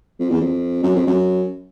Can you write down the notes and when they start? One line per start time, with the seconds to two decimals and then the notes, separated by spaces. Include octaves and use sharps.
0.20 F2
0.30 E2
0.41 F2
0.83 F#2
0.96 F2
1.07 F#2